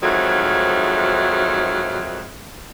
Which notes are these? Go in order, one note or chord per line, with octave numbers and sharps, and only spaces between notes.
F2 G#2 D#3 F#3 A3